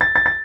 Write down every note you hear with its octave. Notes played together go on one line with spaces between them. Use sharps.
A6
A6
A6